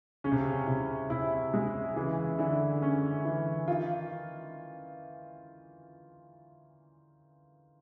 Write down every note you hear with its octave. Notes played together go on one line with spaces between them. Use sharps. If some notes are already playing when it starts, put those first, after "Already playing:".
C#3 C#4
C3
C#3
C3 E4
C3 E4
C3 G#3
C#3 E3
D3 E4
C#4
E3
D#3 F4